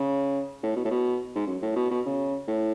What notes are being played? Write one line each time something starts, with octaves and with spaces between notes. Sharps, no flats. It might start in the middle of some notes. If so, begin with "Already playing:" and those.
Already playing: C#3
A2
B2
A2
B2
G#2
F#2
A2
B2
B2
C#3
A2